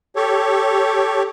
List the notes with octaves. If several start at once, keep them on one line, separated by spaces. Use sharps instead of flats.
G4 A4 C#5